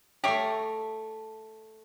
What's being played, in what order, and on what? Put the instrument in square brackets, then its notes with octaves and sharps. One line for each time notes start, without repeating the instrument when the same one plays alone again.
[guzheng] A3 F5 A#5 [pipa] G4 C#5 E5